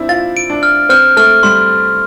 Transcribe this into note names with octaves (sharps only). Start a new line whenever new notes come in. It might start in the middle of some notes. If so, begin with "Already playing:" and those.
Already playing: C4 D4 E4
F4 A6
D7
D4
F6
C4 F6
A3 F6
G3 C6